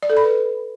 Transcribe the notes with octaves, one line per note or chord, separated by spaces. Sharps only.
D5
A4
B5
B4